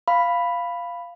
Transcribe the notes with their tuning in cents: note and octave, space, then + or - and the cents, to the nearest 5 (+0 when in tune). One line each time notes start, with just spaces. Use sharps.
F5 -5 B5 +0